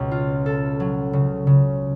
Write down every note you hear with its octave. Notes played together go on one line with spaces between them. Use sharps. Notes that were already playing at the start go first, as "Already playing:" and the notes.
Already playing: C#2 B2
F4
A4
F#3
C#3
C#3